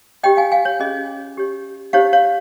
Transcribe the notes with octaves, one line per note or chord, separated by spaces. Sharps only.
G4 C#5 D#5 G5
F5 G#5
F5 G#5
C#5
C#4 F4 G#4 D#5
G4 C#5
D#4 G4 C5 C#5 F5
C#5 F5